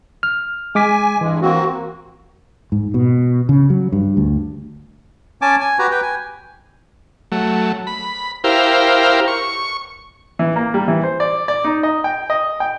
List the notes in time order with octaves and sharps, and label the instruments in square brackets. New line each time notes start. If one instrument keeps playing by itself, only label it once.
[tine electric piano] F6
[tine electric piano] G#3 D6 B6 [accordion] G#5
[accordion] G2 G#3 [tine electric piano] E3
[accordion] A#3 C4 F#4
[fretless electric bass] G#2
B2
C#3
F#3
G2
D2
[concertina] C#4 G#5 A5 D6
G#5
F#4 G4 B4 A#5
B4 G5
G#5
[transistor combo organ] F#3 A3
B5
E4 G4 A#4 C5 F5
C#6
[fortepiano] E3
A#3
G3
E3
C5
D5
D5
D#4
D#5
G5
D#5
G5